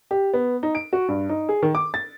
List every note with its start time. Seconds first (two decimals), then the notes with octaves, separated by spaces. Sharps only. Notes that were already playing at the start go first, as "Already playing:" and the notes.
0.11 G4
0.33 B3
0.63 D#4
0.75 D7
0.93 F#4
1.08 G2
1.29 D#4
1.49 G#4
1.62 D#3
1.75 D6
1.94 A6